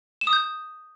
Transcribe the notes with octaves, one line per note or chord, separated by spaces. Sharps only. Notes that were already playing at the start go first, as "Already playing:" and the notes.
E7
D#6
G6